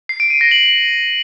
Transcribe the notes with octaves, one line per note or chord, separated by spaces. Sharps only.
C7
D7
D#7
A#6
F#7